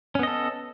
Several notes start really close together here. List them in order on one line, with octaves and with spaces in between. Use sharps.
C#4 B3 D#5 A4